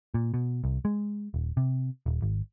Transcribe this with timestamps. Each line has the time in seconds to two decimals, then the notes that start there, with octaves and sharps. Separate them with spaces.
0.14 A#2
0.34 B2
0.64 C2
0.85 G#3
1.34 D#1
1.57 C3
2.06 D#1
2.22 G#1